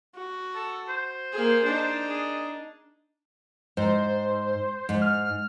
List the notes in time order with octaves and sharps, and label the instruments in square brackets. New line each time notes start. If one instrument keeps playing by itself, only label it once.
[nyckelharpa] F#4
[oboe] A4
C5
[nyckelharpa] A#3 G#4
D4 D#4
[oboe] G#4
[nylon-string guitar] G#2 [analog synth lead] C5
[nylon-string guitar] G#2
[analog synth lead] F6